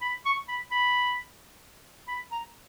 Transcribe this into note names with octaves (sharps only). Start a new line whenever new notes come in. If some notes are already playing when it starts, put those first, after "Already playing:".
B5
C#6
B5
B5
B5
A#5